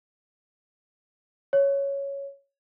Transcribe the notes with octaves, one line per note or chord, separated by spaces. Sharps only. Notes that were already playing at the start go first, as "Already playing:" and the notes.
C#5